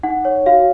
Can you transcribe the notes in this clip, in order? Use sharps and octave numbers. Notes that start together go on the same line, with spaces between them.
D#4 F#5
C#5
F#4 F5